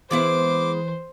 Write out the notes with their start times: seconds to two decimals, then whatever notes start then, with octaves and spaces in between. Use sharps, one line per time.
0.11 E3 G#3 B3 E4 C5 D6